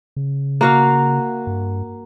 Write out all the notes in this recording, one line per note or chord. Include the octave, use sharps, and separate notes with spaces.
C#3
A#3 F#4 F5
G2